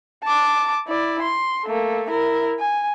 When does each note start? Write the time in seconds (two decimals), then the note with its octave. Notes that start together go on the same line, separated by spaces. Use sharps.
0.24 A5 D6
0.87 E4 D5
1.22 C6
1.65 A3 A#3
2.10 E4 A#4
2.60 G#5